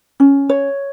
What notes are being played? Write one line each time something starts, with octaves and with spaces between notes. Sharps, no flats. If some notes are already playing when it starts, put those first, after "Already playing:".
C#4
C#5